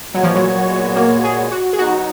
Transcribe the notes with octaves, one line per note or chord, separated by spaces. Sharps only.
A#2 F#3 G#3 B3 F#4 C#5
F3
F#3
A#3
G#4
F#4
G#4
F#3 B3 D#4 F#4